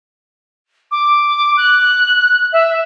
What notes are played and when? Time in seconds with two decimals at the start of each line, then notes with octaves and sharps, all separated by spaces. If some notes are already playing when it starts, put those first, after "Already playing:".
0.91 D6
1.57 F#6
2.53 E5